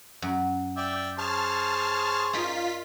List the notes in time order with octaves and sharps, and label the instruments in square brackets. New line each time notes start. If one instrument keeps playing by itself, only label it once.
[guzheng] F#2
[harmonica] D5 E5 G5
[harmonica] G#4 C5 C#5 [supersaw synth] A5 F6
[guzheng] D#4 A#4 D5 [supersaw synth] F4 B6